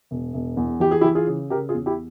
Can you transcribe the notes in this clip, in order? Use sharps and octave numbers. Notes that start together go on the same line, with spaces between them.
E1
E1
E2
E3 G4
G#4
E4 G4
E3
F4 G#4
C#3
C#3 G4 A#4
F4 G#4
E2
E4 G4